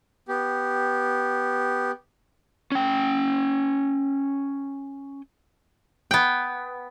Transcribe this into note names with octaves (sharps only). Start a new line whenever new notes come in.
B3 G4
C#4 G5
B3 G5